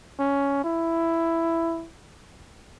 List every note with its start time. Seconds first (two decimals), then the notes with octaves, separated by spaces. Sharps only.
0.19 C#4
0.64 E4